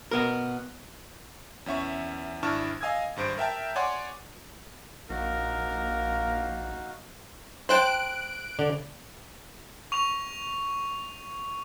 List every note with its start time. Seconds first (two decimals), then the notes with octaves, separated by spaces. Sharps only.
0.11 B2 B3 A#4
1.66 E2 C#4 E5 C#6
2.43 G#1 D4 E4 A5 C#6 F6
2.81 D#5 F5 G#5 D#6 E6 G#6
3.16 G#1 G2 C5 D7
3.37 A#4 E5 G5 A5
3.76 C#5 D5 F#5 G#5 C6 D6
5.10 A#1 A#3 D#4 F#4 A#4 F5
7.69 C5 G5 A5 F#6 D7
8.59 D3 D5
9.92 C#6 F7